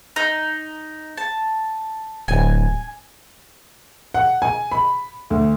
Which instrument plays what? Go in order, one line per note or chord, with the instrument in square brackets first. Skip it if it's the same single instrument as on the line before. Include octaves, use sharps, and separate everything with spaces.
[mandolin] D#4
A5
[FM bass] D1 [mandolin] G#5
[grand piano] F#5
G#5
B5
D2